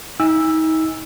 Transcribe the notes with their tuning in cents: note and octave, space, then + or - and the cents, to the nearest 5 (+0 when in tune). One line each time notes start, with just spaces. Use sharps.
D#4 +35 G#5 -35 E6 +0